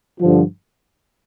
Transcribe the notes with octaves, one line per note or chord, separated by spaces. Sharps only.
G2 D3 F3